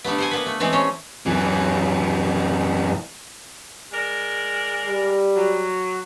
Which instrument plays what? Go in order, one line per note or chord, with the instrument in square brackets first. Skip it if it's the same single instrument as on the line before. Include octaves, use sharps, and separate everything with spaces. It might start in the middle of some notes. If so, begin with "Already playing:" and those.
[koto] D3 G3 A3 B3
C5 F#5 G#5
A#3 B3 B4
A3
E3 G#3 A3 B3 C4
G3 C#4 C5 C#5
[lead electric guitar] F#2 E3
[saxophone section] G#3 A#4 D5
[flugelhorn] G3
[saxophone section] F#3